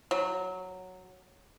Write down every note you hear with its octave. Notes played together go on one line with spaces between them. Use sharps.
F#3